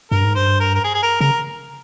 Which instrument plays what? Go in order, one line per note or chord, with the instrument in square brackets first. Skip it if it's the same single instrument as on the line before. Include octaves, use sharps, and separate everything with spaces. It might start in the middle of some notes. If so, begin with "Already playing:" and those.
[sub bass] G2 [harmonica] A#4
[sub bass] G#2
[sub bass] G2 [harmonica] C5
[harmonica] A#4
A#4
G#4
G#4
A#4
[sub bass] C#3 [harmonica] A#4